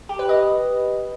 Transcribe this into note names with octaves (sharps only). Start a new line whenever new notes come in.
G4
B4
D#5